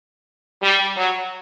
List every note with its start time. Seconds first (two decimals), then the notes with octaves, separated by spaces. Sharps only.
0.63 G3
0.97 F#3